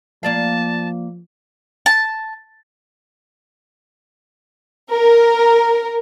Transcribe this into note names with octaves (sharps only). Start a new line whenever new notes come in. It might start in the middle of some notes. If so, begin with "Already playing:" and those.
F3 A#3 D5 F5 A5
A5
A#4